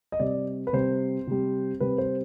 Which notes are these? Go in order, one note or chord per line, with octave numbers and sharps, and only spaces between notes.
D#5
C3 G3 D5
B4
C3 G3 C5
C3 G3
C3 G3 B4
C5